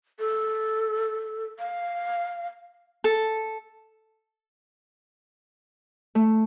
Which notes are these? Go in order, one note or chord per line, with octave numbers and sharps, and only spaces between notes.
A4
F5
A4
A3